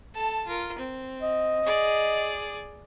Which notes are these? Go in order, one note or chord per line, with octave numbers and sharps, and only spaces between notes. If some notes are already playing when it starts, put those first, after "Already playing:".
A4 A5
F4 A#4
C4
D#5
G#4 D5